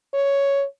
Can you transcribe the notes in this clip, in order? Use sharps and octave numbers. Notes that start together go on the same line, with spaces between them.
C#5